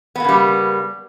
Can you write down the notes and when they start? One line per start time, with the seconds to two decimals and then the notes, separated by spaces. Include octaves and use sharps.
0.16 B3
0.20 A#3
0.24 C#3
0.29 G3